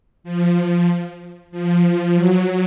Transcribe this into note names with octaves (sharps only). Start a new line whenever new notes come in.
F3
F3
F#3